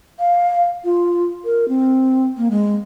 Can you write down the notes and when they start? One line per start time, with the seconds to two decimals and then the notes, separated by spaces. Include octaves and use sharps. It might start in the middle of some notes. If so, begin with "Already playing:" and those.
0.20 F5
0.85 F4
1.45 A#4
1.69 C4
2.37 A#3
2.51 G#3